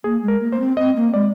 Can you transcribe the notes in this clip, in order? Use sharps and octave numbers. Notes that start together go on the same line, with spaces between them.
A#3 G#4
G#3
A#4
A#3
A#3 C5
C4
C4 D#5
A#3
G#3 D5